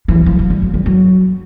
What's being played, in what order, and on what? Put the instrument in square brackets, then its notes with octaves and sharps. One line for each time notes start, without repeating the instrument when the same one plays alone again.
[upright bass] E3
F3
F3
G3
F#3
G3
F#3